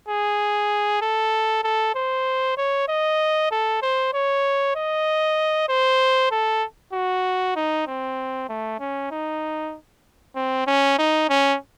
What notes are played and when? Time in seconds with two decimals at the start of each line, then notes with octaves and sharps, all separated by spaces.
0.08 G#4
1.02 A4
1.64 A4
1.95 C5
2.57 C#5
2.89 D#5
3.52 A4
3.82 C5
4.14 C#5
4.76 D#5
5.69 C5
6.32 A4
6.93 F#4
7.56 D#4
7.87 C4
8.49 A3
8.80 C#4
9.11 D#4
10.36 C4
10.67 C#4
10.99 D#4
11.29 C#4